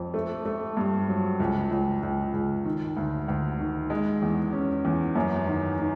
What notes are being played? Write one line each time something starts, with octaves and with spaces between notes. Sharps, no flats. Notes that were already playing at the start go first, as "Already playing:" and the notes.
Already playing: F2
A3
A3
G2
F#3
C#2
C#2
C#2
C#2
D#3
D2
D2
D#3
G#3
E2
C#4
E2
F#2
D#3
D#3